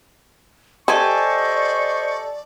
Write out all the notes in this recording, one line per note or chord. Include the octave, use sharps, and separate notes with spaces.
G3 G4 A4 C5 D5 D#5 G#5 C#6